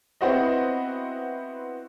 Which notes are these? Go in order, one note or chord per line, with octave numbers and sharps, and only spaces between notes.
B3 C4 E4 F#4 C5 D#5